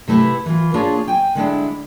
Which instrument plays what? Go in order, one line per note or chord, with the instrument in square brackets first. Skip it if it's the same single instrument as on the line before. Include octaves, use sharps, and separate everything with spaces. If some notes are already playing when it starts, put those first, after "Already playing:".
[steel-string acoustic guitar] C3 A3 E4 B4
E3 F4
A#3 D4 F4 G#4 C#5 A5
G5 G#5
D3 G#3 D4 E4